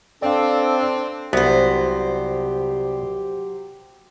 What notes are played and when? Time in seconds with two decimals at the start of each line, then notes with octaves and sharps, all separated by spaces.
0.22 C4 D4 A4 D5 F5
1.33 C2 F#3 B3 G4 C5